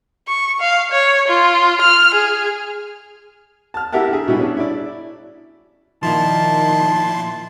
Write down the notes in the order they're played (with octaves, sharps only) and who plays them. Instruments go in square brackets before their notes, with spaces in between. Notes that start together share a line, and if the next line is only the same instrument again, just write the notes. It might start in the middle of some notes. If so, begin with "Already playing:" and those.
[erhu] C#6
F5
C#5
F4
F6
G#4
[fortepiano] A5 F6
E4 G4 A#4 E5 F#5 A5
D3 G#4
B2 G3 E4 G#4
C#4 D4
E4 D5
[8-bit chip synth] A#2 E4 C6 [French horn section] D#3 [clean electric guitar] F3 [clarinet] A5